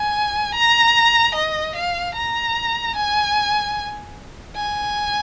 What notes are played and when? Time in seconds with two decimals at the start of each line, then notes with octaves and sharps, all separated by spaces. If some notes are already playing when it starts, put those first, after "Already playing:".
Already playing: G#5
0.55 A#5
1.35 D#5
1.75 F5
2.15 A#5
2.96 G#5
4.56 G#5